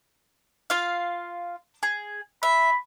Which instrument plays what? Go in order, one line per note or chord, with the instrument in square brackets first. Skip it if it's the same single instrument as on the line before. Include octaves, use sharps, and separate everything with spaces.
[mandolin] F4 F5
G#4
[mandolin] E5 [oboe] B5